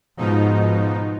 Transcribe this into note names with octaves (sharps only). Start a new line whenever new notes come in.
G#2 B2 F3 D#4